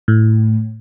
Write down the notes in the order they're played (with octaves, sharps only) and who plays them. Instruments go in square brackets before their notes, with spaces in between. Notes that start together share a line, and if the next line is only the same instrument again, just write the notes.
[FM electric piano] A2